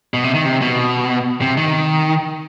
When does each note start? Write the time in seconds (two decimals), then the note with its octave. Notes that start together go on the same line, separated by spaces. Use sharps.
0.14 B2
0.24 C3
0.35 D#3
0.45 C3
0.61 B2
1.41 C3
1.57 D#3